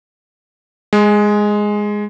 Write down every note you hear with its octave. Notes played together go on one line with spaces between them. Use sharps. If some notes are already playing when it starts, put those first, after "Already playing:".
G#3